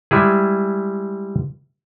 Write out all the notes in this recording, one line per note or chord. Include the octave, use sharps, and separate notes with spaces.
G3 G#3 E4 G#4